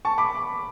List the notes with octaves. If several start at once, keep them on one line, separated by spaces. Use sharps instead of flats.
A5 C#6
B5 D6